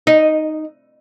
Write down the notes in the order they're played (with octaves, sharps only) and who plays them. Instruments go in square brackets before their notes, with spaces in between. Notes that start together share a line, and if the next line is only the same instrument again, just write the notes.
[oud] D#4